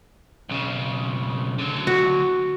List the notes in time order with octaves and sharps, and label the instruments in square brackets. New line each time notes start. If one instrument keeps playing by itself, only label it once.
[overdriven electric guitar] B1 C#3
D3 F#3
[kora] F#4